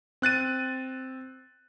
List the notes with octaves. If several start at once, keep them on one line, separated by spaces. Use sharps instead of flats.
C4 F#6 A6 D#7